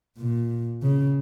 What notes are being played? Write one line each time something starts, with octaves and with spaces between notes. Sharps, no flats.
A#2
C#3